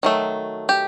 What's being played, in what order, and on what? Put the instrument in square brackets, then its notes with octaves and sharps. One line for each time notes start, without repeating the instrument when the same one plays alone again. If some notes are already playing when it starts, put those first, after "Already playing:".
[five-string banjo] D#3 F#3 A3
G4